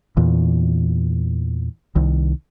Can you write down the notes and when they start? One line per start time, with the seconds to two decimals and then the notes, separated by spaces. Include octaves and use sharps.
0.17 E2 A#2 E3
1.95 C2 D#3